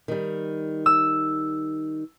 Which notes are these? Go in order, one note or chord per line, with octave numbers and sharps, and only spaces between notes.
D#3 G3
E6